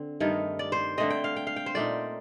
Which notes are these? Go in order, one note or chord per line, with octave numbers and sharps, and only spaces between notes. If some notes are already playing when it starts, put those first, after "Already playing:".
Already playing: D3 C4
G2 D#3 A3 D#4
D5
C5
D3 A3 C4 D#5
G5
F5
G5
F5
G5
C5
A#2 A3 D#4 D5